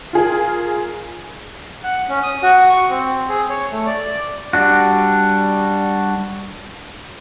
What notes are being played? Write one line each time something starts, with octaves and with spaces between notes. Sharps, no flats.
F4 G#4 A#4
F#5
C#4
D#6
F#4
C#6
C4
G#4
C#5
A3
D5
G3 D4 F#4